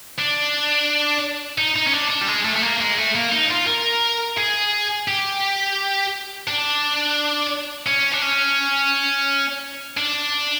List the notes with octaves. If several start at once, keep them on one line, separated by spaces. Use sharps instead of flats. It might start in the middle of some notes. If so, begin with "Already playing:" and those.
D4
D#4
D#4
C#4
D4
D4
G3
G#3
A3
A3
A#3
G#3
A3
A#3
D#4
F4
A#4
G#4
G4
D4
C#4
D4
C#4
D4